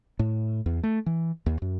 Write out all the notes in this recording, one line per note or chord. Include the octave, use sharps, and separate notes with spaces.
A2
E2
A3
E3
D#2
F#2